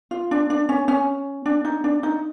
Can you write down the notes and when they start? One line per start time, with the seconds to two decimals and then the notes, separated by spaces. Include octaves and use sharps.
0.11 F4
0.31 D4
0.50 D4
0.69 C#4
0.88 C#4
1.46 D4
1.65 D#4
1.84 D4
2.03 D#4